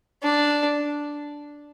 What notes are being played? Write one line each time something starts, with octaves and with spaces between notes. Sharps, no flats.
D4